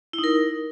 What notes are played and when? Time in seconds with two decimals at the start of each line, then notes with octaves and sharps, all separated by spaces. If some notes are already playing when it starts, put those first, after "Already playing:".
0.13 E4
0.19 D#4
0.24 A#4